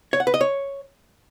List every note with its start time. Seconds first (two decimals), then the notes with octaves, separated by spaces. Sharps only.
0.13 C#5
0.20 F#5
0.27 B4
0.34 D#5
0.41 C#5